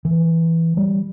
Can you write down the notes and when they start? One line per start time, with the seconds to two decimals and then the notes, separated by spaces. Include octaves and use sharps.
0.05 E3
0.77 G3